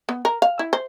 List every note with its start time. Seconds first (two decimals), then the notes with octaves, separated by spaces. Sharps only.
0.09 B3
0.25 A#4
0.42 F5
0.59 E4
0.73 C5